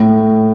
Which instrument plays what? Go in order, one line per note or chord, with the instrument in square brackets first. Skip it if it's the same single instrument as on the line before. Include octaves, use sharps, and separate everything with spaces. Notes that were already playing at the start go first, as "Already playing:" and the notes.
Already playing: [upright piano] A2